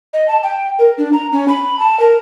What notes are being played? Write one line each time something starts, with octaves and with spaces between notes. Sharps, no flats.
D#5
A5
G5
A#4
D4
A#5
C#4
B5
A5
A#4